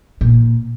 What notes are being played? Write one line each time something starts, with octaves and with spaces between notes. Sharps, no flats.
A#2